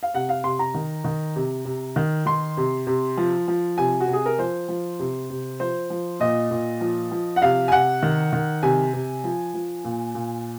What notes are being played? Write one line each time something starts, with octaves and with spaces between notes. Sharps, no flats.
F5
C3 F#5
F5
C3 C6
A#5
D#3
D#3
C3
C3
D#3
D#3 C6
C3
C3
F3
F3
C3 G#5
F#4
C3
G#4
A#4
F3 C5
F3
C3
C3
F3 C5
F3
A#2 D#5
A#2
F3
F3
F#5
C3 F5
G#5
C3 F#5
D#3
D#3
C3 G#5
C3
F3
F3
A#2
A#2